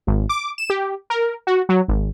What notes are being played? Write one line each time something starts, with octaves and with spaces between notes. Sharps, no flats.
G#1
D6
E7
G4
A#4
F#4
F#3
G#1